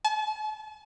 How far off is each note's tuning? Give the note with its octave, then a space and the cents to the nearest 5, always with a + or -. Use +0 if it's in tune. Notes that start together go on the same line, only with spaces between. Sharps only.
A5 -40